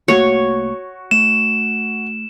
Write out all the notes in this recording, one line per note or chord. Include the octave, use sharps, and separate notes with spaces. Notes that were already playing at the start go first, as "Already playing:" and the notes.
C2 A3 A#3 F#4 C#5
A3 E7